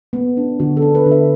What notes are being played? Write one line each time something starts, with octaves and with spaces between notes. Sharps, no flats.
B3
D4
D3 F#4
A4
D4
B4
D3
E5